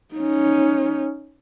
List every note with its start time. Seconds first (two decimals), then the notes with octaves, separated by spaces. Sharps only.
0.14 C#4 D#4